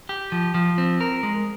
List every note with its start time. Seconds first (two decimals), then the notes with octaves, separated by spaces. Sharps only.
0.09 G4
0.32 F3
0.54 F3
0.78 C4
1.01 A#4
1.23 G#3